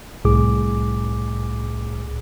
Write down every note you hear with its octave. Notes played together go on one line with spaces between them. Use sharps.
C2 A2 G#4 D6